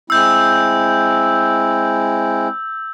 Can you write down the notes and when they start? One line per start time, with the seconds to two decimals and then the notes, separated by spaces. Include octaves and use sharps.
0.10 G#3 C4 E4 E6 G6